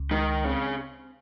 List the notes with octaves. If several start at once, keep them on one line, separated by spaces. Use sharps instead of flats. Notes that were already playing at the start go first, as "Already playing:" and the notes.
Already playing: C#2
D#3 G#3
C#3 C4